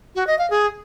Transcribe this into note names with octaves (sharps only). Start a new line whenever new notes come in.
F#4
D#5
F5
G#4